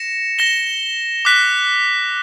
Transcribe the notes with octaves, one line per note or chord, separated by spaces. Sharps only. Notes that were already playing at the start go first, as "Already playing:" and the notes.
Already playing: A#6 C#7 E7
A#6 E7 G7
D6 F#6 B6